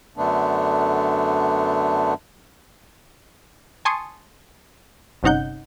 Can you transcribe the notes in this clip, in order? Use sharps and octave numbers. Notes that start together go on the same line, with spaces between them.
F#2 D3 A3 B3 D4
G#5 A5 C6 C#6 D#6
G1 C3 C#4 D#4 F#5 G6